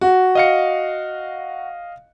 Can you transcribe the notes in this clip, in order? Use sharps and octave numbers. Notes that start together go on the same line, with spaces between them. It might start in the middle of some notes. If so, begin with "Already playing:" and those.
F#4
D#5 F5 C#7